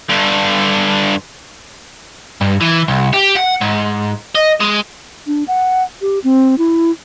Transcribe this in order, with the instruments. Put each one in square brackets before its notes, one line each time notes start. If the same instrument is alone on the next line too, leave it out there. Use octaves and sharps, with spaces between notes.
[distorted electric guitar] G2 D3
[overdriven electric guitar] G2
E3
C2
G4
F#5
G#2
D#5
G#3
[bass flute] D4
F#5
G4
C4
E4